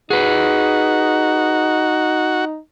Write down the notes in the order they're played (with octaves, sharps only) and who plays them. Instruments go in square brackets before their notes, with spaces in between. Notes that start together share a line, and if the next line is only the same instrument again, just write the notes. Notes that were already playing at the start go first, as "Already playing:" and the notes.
[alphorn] D#4 [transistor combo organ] F#4 [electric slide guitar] G#4 B4